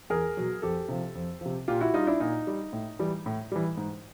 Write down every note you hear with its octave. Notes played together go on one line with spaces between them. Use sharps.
E2 G#4 A#4
B2 F#3
F2 G4 A4
C3 F3
F2
C3 F3
A#2 F4 G4
E4 F#4
G3 D#4 F4
D4 E4
A#2 D#4
G3
A2
E3 G3
A2
E3 G3
G#2